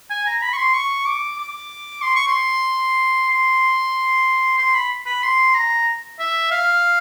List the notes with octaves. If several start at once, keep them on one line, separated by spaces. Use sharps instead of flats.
G#5
A#5
B5
C#6
C6
C#6
D6
D6
C6
C#6
C6
C6
C6
B5
B5
C6
A#5
E5
F5